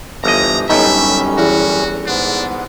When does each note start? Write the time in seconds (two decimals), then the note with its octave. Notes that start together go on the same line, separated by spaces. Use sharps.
0.24 G1 E3 F3 D#5 A#5
0.70 G1 F#2 A2 G3 C#4 D#4 E5
1.38 E2 F#4
2.07 G#2 B3 D4